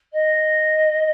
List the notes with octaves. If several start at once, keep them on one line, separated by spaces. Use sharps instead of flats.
D#5